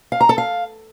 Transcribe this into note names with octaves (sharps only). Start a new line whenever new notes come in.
F5
A#5
A4
F5